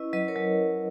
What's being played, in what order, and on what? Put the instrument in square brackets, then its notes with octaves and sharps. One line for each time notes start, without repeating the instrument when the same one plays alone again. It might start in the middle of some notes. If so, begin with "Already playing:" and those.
Already playing: [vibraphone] C#4 E4 B4 D#5
F#3 B4 D#5
A#4 C#5
F#3